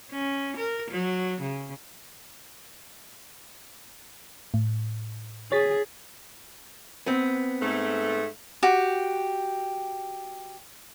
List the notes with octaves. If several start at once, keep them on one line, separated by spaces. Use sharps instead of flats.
C#4
A#4
F#3
C#3
A2
G#4 C#5 A6 B6
B3 C4
G#2 A3
F#4 G4